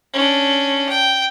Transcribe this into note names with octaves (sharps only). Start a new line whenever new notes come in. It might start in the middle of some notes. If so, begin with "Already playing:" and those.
C#4 D4
G5